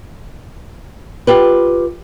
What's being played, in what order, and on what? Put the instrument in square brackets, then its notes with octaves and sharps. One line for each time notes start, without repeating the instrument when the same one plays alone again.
[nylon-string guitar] F4 G4 B4